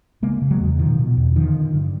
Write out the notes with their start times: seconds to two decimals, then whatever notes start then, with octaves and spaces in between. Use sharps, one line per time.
0.22 C#3 G#3 A#3
0.42 C#3
0.51 F#3 G#3
0.60 E2
0.79 B2 D#3 F3
0.99 B2
1.17 E2
1.36 D3 D#3 F3
1.56 D3
1.74 G2